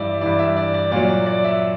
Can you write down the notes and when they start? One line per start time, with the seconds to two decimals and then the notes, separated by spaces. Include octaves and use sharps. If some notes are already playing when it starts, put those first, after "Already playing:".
Already playing: G2 E3 D5 E5
0.21 G2 E3 D5
0.39 E5
0.56 D5
0.74 D5
0.92 A#2 F#3 D5
1.09 D5
1.26 D5
1.44 E5